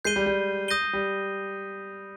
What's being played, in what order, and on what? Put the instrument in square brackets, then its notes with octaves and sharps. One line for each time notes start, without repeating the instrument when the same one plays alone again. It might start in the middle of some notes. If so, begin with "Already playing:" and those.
[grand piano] G#3 [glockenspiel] G6 C7 D#7 G7
[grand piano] G3
G3
[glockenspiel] D#6 G6 A#6 D#7 G7
[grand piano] G3